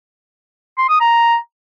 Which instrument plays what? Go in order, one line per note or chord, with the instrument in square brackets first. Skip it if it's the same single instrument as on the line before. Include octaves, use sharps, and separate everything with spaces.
[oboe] C6
D#6
A#5